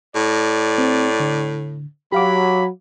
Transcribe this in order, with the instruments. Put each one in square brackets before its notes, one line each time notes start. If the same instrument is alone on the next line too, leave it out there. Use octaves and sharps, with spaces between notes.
[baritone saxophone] A2 [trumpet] D5
[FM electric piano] C4
D3
[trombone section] F#3 [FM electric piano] G4 F5 D6 [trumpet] B5